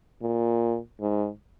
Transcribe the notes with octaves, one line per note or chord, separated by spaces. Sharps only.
A#2
G#2